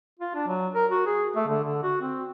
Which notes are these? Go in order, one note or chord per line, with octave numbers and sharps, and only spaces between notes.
F4
D4
F#3
A#4
F#4
G#4
A3
D3
D3
F#4
C4